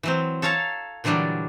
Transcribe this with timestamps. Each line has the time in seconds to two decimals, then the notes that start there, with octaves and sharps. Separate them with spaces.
0.03 E3 F#3 C4
0.42 A4 C#5 F5 A5 A#5
1.04 A#2 D3 E3 F#3 G3 D4